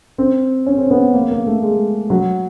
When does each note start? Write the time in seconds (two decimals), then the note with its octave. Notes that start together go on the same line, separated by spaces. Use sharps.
0.18 C4
0.66 C#4
0.78 C4
0.91 B3
1.14 A#3
1.31 A#3
1.47 A3
1.63 G#3
2.10 F#3